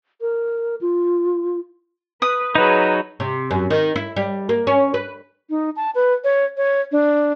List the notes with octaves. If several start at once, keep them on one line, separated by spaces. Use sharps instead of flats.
A#4
F4
B4 D#6
F#3 D#4 G#4 B4 C#5
C3
F#2
D#3
E4
G3
A#3
C#4
B4
D#4
A5
B4
C#5
C#5
D4